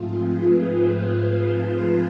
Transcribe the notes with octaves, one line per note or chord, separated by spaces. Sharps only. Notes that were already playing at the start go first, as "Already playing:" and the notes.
Already playing: G#2 F3 A3 C4 F4 G#4
B4
C5
F5
A5
A5